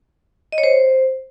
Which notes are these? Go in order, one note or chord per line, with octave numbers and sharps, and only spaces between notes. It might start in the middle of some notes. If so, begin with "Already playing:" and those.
D#5
C#5
C5